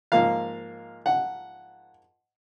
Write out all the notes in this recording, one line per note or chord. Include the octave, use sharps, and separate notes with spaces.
G#2 F3 A#3 F5
F#5